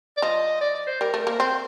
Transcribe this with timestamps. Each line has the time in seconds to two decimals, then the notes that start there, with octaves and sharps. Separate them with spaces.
0.17 D5
0.22 F3 D#5
0.61 D5
0.75 D5
0.87 C5
1.01 G3 A#4
1.14 A3
1.20 A#4
1.27 A#3
1.32 A#4
1.40 C4 C5